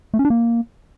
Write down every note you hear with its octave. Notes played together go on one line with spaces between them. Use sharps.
A3
C#4
D4
A#3